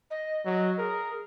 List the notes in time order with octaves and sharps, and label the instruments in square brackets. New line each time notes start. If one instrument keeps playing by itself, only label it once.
[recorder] D#5
[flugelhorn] F#3 [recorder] D#5
[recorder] G#4 [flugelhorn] A#4